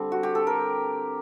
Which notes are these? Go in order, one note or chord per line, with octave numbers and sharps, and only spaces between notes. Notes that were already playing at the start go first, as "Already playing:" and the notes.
Already playing: D3 G3 C4
F#4
G4
A4
A#4